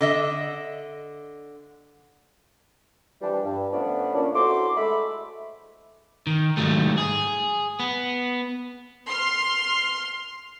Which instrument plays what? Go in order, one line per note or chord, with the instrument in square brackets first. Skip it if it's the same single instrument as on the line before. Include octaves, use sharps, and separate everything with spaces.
[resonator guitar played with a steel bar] D3 D#5 E5
[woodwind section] E3 F3 G3 D4
G2
F3 A3 B3 C#4 D4 D5
A#2 C#4 D4
E4 F#4 A4 C5 C6 D6
G#3 A3 E5 B5
[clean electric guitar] D#3
G#2 C3 D#3 F#3 G3 A3
G#4
B3
[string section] C6 F6 C7